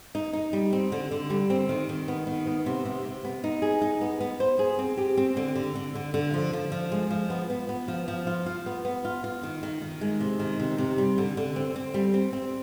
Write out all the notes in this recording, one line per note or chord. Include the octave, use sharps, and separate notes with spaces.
D#4
D#4
G3
C4
D3
D3
G3
C4
D#3
D#3
B3
D#3
B3
C3
C3
C3
B3
D#4
G#4
D#4
B3
B3
C5
G#4
C4
G4
C4
D3
D3
D3
D3
D3
F3
F3
F3
G#3
F3
B3
B3
B3
F3
F3
F4
F4
B3
B3
F4
F4
D#3
D#3
D#3
G#3
C3
D#3
C3
C3
G3
D3
D3
C4
C4
G3
C4
C4